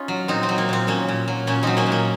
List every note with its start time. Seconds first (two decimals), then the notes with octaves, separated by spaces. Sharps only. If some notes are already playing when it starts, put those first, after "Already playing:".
Already playing: C#4 D#4 F4
0.08 F#3
0.28 A#2 C4 D#4
0.43 C4
0.49 F#3
0.58 A#3
0.69 A#2 C4
0.87 A#2 A#3 C#4
1.08 A#2
1.28 F#3
1.47 A#2 A#3 C#4
1.63 F#3 C4 D#4
1.77 A#3 C#4
1.87 A#2
1.92 A#3